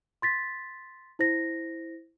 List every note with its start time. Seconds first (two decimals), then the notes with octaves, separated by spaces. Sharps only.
0.22 C6 A6 B6
1.19 E4 C5 A#6